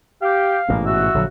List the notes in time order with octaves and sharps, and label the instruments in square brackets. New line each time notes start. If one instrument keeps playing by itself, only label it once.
[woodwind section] G4 [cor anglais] F5
[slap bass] A1 G#2 B2 [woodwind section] A#3
[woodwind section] F#4 [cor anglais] E5
[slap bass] A#1 D3 F#3